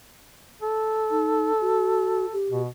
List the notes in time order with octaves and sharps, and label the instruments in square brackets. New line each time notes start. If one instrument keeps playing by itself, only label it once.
[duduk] A4
[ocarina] D#4
F#4
G4
[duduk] B2